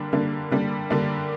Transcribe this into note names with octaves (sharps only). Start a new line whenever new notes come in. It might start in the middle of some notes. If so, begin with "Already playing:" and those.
Already playing: D3 G3 A#3 D4
D3 G3 A#3 D4
D3 G3 A#3 D4
D3 G3 A#3 D4